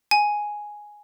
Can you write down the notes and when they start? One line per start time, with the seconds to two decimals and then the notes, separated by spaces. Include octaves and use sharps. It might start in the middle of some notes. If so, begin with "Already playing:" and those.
0.11 G#5